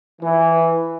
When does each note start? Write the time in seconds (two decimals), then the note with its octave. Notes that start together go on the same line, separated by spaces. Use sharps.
0.22 E3